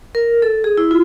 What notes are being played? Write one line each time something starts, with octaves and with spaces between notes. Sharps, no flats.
A#4
A4
G#4
E4
F4